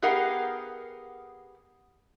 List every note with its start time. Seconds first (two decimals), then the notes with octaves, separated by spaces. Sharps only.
0.02 B3 G4 G#4 A#4 F5 F#5